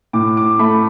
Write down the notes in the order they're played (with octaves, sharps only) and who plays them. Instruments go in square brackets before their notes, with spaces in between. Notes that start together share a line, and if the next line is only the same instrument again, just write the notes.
[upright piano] A2 D6
D6
A3 B5